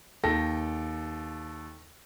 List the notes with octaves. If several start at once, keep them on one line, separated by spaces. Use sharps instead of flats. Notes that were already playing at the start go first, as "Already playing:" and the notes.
D#2 A4 G5 A#6